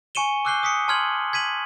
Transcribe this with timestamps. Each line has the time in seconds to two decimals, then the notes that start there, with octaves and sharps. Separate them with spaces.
0.15 G#5 C#6 C#7 D#7 E7 G7
0.45 D6 E6 F#6 G6 C7 G7
0.63 D#6 B6 C#7
0.88 A5 C6 F6 G#6 F#7
1.33 G#6 B6 D#7 F#7